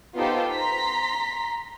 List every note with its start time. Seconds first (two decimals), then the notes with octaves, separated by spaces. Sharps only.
0.16 B3 D#4 F4 G4 A4 C5
0.52 A#5 C6 B6